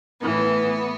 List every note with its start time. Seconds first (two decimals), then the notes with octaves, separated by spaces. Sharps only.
0.21 A2 E3 B3